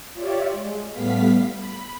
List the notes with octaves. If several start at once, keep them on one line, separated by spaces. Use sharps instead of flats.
F4 G4 C#5 D5 E5
G#3
A2 G3 A3 B3 F5 B6
B5